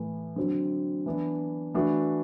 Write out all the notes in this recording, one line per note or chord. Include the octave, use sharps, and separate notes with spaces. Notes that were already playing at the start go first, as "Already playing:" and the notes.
Already playing: A2 E3 A3
D3 F#3 C4
E3 B3 D4
E3 A3 D4 F#4